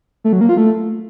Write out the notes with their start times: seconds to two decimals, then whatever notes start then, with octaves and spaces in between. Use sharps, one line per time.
0.24 A3
0.33 F#3
0.41 A#3
0.49 F4
0.57 A3